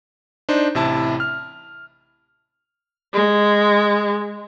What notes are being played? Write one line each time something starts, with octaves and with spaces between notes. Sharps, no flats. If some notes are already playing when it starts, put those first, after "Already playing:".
D4 D#4 C5
A1 C3 E4 A5
F6
G#3